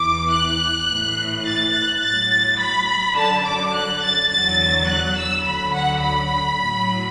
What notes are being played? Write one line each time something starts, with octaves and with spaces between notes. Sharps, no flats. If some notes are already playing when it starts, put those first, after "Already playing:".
Already playing: E2 E3 D6
F#6
A2 E3
A6
F#6
A2 F#3 A6
B5
F#2 D3 F#3 A5
D6
F#6
A6
E2 D3 F#3 A6
F#6
E6
D2 D3 F#3 B5
F#5
B5
A2 F#3